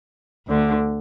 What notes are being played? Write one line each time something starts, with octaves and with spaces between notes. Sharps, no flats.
D2 D3